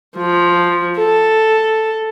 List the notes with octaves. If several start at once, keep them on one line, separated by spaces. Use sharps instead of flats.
F3
A4